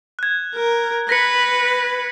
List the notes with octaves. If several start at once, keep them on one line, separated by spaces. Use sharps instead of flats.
F#6 G#6
A#4
B4 A#6 B6 C#7